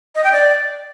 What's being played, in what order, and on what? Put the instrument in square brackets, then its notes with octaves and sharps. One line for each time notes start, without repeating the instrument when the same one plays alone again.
[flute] D#5
G5
D5